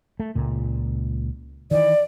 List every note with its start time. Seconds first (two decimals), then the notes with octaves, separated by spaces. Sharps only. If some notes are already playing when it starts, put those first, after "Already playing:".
0.20 A3
0.35 C#2 A#2
1.71 D#3 E3 D5